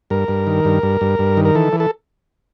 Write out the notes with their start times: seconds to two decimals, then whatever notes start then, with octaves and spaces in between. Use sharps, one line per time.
0.10 G2 A#4
0.28 G2
0.47 D#3
0.65 G2
0.83 G2
1.01 G2
1.19 G2
1.37 D#3
1.45 A#4
1.55 E3 A4
1.73 E3
1.80 A4